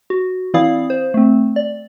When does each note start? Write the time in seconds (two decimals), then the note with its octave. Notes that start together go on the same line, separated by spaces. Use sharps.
0.10 F#4
0.54 E3 C4 E4 D5 F5 D#6
0.90 C5
1.14 A3 C4
1.56 D5